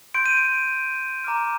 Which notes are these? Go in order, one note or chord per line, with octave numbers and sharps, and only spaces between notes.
C6 G6 D7
D#7
D7
A#5 D6 F6 D7